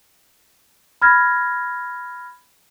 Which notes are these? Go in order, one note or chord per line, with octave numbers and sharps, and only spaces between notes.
B5 F6 G#6 A#6